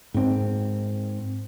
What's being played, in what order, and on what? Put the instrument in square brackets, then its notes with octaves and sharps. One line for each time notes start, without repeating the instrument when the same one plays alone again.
[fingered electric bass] G#2 C4